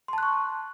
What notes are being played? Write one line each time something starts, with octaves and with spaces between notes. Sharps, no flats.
A5 C6 C#6 F#6